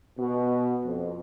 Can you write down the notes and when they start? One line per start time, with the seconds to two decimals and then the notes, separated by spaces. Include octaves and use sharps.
0.18 B2
0.84 F2